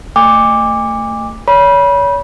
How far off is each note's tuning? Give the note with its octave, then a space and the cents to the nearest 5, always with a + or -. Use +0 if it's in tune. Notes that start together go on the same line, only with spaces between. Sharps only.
A3 +30 G#5 -40 D6 +0
C#5 +30 B5 -25